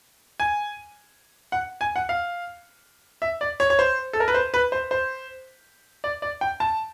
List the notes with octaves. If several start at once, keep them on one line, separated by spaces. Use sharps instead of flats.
G#5
F#5
G#5
F#5
F5
E5
D5
C#5
C#5
C5
A4
A#4
B4
C5
B4
C5
C5
D5
D5
G5
A5